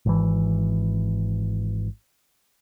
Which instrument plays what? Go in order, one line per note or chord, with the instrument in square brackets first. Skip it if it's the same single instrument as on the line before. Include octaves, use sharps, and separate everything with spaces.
[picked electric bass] G#1 E3